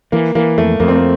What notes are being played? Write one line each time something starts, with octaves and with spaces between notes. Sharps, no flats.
E3 A#3
E3 A#3
F2 A3
F2 A#3
C4
A#3